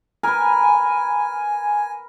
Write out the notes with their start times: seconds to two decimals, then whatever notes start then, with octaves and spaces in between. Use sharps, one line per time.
0.23 A#4 B4 G#5